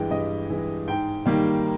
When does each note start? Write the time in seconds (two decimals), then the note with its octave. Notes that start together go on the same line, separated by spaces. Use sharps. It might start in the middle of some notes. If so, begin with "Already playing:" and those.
Already playing: G2 E3 G#3 G5
0.11 G2 D#5
0.50 E3 G#3
0.88 G#2 G5
1.26 D#3 G3 A#3